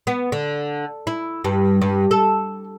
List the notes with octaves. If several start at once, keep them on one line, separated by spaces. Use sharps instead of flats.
B3
D3
E4
G2
G2
A4